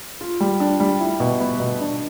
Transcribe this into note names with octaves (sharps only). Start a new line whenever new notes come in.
F4
G3
D4
G3
E4
B2
B3
B2
D4